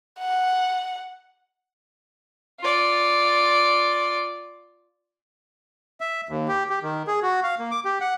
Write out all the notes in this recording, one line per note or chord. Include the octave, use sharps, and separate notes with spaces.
F#5
F4 D5
E5
D#2
G4
G4
D#3
G#4
F#4
F5
A#3
D6
G4
F#5